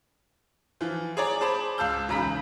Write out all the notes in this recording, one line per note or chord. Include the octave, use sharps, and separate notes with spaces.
E3 F3 F4
G#4 C#5 D5 A#5
G#4 C5 A5 B5 D6
C#2 F5 A5 E6 G6
E1 B1 C#3 A#5 B5 B6